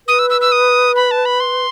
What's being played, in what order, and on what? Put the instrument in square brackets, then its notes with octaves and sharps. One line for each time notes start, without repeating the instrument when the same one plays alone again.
[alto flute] B4 [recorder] D#6
[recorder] E6
E6
E6
D#6
B5
A5
B5
C6